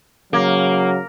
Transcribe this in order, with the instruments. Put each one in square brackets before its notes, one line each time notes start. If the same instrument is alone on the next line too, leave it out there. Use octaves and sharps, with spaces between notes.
[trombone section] C#3 F#3 [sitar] A#3